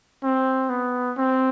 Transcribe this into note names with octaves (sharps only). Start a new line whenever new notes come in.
C4
B3
C4